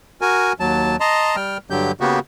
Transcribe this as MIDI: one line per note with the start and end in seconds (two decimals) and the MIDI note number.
0.21 0.53 66
0.21 0.53 70
0.21 0.53 80
0.60 0.96 39
0.60 0.96 54
0.60 0.96 81
1.00 1.36 75
1.00 1.36 81
1.00 1.36 82
1.00 1.36 84
1.36 1.58 55
1.36 1.58 79
1.36 1.58 89
1.70 1.92 43
1.70 1.92 50
1.70 1.92 54
1.70 1.92 67
1.70 1.92 91
2.00 2.19 49
2.00 2.19 58
2.00 2.19 59
2.00 2.19 66
2.00 2.19 67